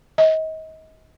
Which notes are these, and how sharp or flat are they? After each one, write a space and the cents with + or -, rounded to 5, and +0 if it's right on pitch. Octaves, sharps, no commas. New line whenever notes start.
D#5 +35